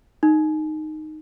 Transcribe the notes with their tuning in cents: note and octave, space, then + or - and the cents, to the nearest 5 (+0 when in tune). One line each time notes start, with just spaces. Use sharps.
D#4 -10